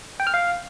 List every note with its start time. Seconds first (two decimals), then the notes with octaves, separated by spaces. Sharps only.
0.20 G5
0.27 F6
0.34 F5